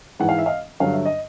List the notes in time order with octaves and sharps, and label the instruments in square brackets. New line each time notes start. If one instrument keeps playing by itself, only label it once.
[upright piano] G#2 E3 G#3 F#5
F5
E5
D#5 F5
G2 D3 F#3 F5
E5
D#5